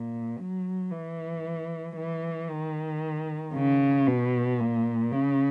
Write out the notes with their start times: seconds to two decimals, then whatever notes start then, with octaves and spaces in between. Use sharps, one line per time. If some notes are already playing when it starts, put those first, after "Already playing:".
Already playing: A#2
0.39 F#3
0.91 E3
1.96 E3
2.50 D#3
3.54 C#3
4.07 B2
4.60 A#2
5.12 C#3